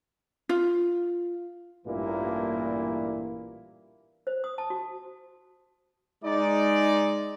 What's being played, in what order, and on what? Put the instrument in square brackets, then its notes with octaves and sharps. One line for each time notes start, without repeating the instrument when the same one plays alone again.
[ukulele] F4
[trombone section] A1 G2 A#2 E3 A#3 E4
[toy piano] C5
D#6
A5
F#4
[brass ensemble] G#3 D#4 D5